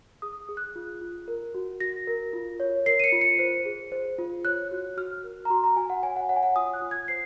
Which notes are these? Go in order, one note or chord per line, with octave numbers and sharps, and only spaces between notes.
G#4 D#6
G#4
F#6
F4
F4
A#4
F#4
F#4 A#6
A#4
F4
C#5
A#4 C7
D#7
C#7
F4
C#7
C5
G#4
C5
F4
C#5 F#6
F#4
F#4 F6
A#4
A#5
F#4 C6
A#5
F#4 G#5
F#5
C#5 G#5
F#5
C#5 F#5
G#5
F#5
F4 D#6
F#6
F4
G#6
C5 C7